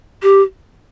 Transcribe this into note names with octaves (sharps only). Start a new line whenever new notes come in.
G4